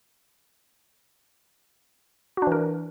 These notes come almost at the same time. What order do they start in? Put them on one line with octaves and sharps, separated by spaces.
F#4 D4 E3 A#4